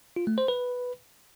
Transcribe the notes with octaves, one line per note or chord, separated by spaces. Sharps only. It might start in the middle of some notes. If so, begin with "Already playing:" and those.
F4
A3
C5
B4